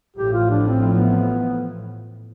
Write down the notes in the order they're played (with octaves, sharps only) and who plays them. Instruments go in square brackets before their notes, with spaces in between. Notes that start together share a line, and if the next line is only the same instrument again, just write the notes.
[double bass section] A1 A2 F3 [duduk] G4
[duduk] F4
D4
C4
B3